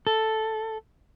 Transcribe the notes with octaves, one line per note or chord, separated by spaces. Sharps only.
A4